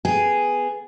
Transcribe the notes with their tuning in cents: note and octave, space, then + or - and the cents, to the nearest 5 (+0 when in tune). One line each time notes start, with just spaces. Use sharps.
B3 +10 G#4 +0 G5 +5